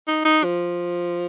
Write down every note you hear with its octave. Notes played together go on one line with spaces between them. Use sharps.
D#4
D#4
F3